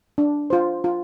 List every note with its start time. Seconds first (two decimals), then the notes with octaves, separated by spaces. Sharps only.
0.18 D4
0.50 F4 C5
0.84 F4